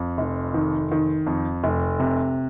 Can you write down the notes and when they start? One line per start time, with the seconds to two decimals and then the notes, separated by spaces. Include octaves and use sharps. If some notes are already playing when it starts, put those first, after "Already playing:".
Already playing: F2
0.18 F1
0.54 D#3
0.91 D#3
1.26 F2
1.64 F1
2.00 C3